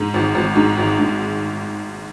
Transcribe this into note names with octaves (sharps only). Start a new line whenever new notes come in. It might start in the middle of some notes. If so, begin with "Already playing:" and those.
Already playing: G#2
G#1
G#1
G#2
G#1
G#2